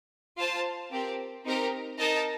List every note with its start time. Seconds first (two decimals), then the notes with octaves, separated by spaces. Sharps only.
0.37 F4 C5 F5 A5
0.91 C4 G4 A#4
1.45 C4 D#4 G4 A#4
1.98 D#4 A#4 D#5 A5